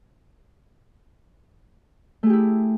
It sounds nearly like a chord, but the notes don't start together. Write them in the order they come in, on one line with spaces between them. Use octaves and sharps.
A3 G#4 G4 E4